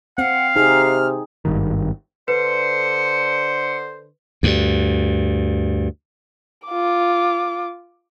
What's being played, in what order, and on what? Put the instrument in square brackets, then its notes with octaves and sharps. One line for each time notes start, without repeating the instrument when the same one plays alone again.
[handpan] C4 [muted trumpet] F5 [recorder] F#5
[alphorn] C3 [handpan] D#4 G#4 [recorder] F6
[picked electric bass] G#1 G2 D#3
[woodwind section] D3 C5 [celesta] B4 [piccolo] C#7
[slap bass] D2 G2
[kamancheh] F4 D6